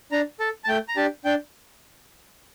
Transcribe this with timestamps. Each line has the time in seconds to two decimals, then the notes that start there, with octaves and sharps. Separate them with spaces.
0.12 D4 A#5
0.40 A4 A5
0.64 A5
0.68 A3 G5
0.88 A#5
0.96 D4 G4 A5
1.25 D4 G5